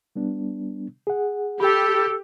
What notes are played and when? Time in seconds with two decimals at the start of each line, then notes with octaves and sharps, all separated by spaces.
0.16 G3 B3 D4
1.07 G#4 F#5
1.60 G4 A4 G5 B5